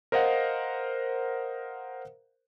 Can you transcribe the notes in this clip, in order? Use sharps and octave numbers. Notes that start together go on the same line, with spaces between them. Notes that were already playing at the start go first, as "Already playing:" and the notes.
A#4 C5 D#5 F5 F#5